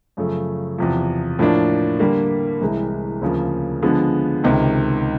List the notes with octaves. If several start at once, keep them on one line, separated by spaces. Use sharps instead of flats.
F#2 C#3 F3 A3
E2 C3 F3
A2 F3 A#3 D4
D3 G3 A#3
C2 C3 E3 G#3
D2 C#3 F3 A#3
D3 F3 G#3 B3
C#2 C3 D#3